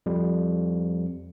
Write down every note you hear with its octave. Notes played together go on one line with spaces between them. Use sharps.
F2 G3